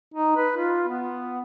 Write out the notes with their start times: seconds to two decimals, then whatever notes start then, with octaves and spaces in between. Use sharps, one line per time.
0.14 D#4
0.37 B4
0.56 F4
0.88 B3